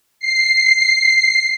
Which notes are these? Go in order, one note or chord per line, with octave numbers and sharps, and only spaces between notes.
C7